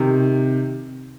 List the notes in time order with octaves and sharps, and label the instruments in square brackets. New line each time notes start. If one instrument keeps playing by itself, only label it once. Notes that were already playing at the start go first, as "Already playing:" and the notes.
Already playing: [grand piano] C3 D#3